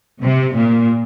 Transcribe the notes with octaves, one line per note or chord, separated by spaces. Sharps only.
C3
A#2